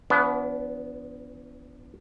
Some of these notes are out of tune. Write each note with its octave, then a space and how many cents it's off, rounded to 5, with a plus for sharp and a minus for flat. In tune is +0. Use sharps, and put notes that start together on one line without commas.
E3 +40 B3 +0 D4 -40